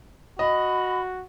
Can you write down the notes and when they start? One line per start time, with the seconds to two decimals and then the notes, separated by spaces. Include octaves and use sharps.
0.39 F#4 D#5 B5